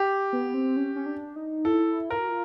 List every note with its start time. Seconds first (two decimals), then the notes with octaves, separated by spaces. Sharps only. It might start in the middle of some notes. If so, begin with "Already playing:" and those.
Already playing: G4
0.33 B3
0.54 C4
0.77 C#4
0.96 C#4
1.06 D4
1.36 D#4
1.65 E4 A4
2.09 F4 A#4
2.19 F#4
2.29 F4